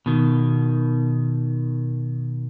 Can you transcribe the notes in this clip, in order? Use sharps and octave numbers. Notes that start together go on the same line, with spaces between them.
B2 D#3